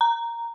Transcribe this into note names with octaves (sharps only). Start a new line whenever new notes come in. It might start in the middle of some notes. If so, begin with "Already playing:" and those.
A#5